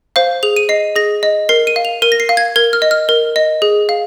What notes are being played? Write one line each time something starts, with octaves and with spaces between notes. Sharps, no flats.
C5 F5
G#4 F7
D#7
D#5 C7
G#4 A#6
D#5
A#4 C7
D#7
F5
F7
A#4 D#7
A#6
C7
F5
G#6
A#4 G#6
F6
D#5
F6
A#4
D#5
G#4
F5